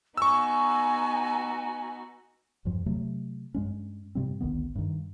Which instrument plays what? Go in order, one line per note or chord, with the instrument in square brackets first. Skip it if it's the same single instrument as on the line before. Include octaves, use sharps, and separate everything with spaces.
[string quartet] B3 D#4 F#4 [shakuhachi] G#5 [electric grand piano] C#6 E6
[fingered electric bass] E2 G2 F3
C3 F#3 A3
G2 G#3 C#4
G#2 C3 G3 C4
G#1 D2 D#3 B3
G2 D#3